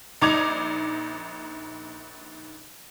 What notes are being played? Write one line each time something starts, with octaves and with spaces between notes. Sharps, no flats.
A#1 D#4 D6 G#6 F7